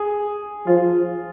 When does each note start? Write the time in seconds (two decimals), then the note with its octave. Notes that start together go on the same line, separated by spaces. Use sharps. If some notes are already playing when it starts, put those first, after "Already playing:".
Already playing: G#4
0.67 F3 F4